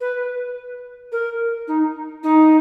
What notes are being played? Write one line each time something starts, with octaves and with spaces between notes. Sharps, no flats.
B4
A#4
D#4
D#4